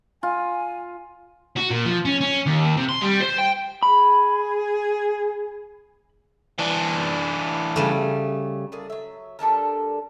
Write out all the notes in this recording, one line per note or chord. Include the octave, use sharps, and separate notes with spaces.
F4 G#5
F#4
A#2
F3
C#4
C#4
D#2
C3
C6
G3
C5
G5
G#4 B5
E3 D4
C#3 G3 A3
A2 A#3 G#4 D5
F#3 E5
G3 D4 A4 A#4